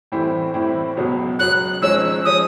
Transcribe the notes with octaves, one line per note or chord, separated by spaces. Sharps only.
A2 E3 G3 C4 E4
A2 E3 G3 C4 E4
C#2 B2 F#3 B3
C#2 B2 F#3 B3 F#6
G#1 G#2 F3 G#3 C#4 E6
F3 G#3 C#4 D#6